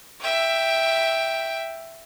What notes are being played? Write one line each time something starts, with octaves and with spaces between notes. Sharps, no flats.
E5 G5